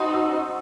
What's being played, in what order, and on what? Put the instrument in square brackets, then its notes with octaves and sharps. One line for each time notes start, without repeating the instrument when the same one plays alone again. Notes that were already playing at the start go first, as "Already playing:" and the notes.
Already playing: [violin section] D#4 F#4 C5 [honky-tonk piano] A5 B5 C6 D#6
[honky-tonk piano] E6